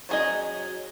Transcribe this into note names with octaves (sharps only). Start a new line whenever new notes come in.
F#3 C#4 G#4 D#5